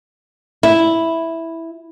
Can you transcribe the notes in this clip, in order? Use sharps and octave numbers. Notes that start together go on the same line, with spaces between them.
E4